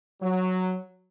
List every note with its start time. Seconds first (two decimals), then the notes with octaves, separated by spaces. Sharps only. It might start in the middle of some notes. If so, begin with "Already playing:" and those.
0.22 F#3